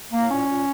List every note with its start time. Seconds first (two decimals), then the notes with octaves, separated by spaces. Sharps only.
0.11 A2 A#3
0.29 A#2 C#4
0.48 A#2